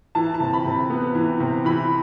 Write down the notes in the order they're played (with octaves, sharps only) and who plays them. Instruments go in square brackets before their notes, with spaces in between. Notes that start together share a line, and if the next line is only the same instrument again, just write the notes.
[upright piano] E3 A5
A5
C3
B5
C3
B3
E3
C3
E3 B5